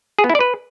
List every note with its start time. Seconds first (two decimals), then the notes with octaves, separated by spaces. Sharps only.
0.19 G#4
0.24 B3
0.29 E4
0.35 D5
0.40 B4